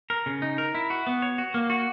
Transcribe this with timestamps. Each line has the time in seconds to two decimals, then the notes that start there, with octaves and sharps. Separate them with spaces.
0.10 A#4
0.26 C#3
0.42 D#4
0.58 A#4
0.75 E4
0.90 F#4
1.07 B3
1.22 C#5
1.38 F#4
1.54 A#3
1.70 F#4